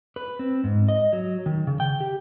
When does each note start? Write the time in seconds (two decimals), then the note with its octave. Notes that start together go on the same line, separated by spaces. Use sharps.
0.16 B4
0.39 C4
0.64 G#2
0.88 D#5
1.13 F#3
1.46 D#3
1.67 C#3
1.80 G5
2.01 G4